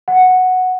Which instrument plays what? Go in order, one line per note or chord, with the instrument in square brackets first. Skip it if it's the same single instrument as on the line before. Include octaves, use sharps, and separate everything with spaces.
[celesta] F#5